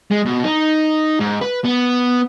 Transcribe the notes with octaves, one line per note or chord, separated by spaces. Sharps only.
G#3
B2
D#4
G#2
B4
B3